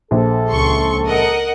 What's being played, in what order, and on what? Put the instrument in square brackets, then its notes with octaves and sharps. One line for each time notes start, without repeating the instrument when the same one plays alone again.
[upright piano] A#1 C5 [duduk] A4
[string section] C#2 C6 C#6
A#4 D#5 F#5